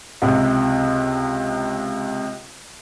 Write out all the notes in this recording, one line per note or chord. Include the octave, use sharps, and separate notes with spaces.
C#2 C3